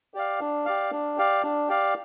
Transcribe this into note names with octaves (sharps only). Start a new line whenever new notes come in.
G4 D5 F5
D4
G4 D5 F5
D4
G4 D5 F5
D4
G4 D5 F5